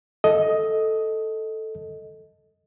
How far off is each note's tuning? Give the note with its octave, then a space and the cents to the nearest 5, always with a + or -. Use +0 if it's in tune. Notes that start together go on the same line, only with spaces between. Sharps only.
A4 +0 D#5 +10